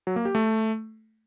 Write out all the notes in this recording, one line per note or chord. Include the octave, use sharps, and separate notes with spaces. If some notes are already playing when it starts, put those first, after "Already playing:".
F#3
A#3
G4
A3